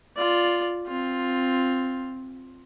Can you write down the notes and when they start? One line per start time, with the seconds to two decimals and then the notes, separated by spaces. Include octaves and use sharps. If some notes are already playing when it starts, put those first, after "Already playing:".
0.16 F4 D5
0.87 C4 F4